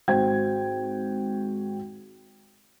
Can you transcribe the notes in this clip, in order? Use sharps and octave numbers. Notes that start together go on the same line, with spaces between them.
G#1 F#4 C5 G5 G#6